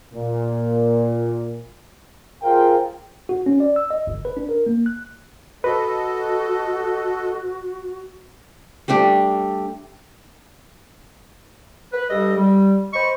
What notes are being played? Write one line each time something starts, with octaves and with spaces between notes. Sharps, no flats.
A#2
F4 G#4 A#4 C5 F5 G5
F#4
C#4
D5
E6
D#5
G1
B4
D4
A#4
A#3
F#6
F#4 A4 B4 D#5
G3 A3 D4 G4
B4
G2 G3 G4 A4 D#5
G3
C5 D#5 B5 C#6